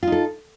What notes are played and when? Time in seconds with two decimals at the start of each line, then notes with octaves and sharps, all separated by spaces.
0.03 F4
0.07 D#4
0.12 A4